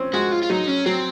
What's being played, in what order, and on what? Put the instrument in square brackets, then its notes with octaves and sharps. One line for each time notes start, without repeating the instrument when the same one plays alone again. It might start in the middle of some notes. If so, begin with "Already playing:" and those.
Already playing: [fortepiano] C4 C#4
[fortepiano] G#3 [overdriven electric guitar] F#4
[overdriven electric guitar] F4
F4
[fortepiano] F#3 [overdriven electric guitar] D#4
[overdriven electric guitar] C#4
[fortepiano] F#3 [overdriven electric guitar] C4